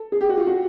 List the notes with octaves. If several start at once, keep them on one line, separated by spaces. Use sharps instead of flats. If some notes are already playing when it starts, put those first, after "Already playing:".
Already playing: A4
G#4
G4
F#4
F4
F#4